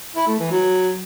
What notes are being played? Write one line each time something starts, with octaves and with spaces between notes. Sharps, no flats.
E4
A3
E3
F#3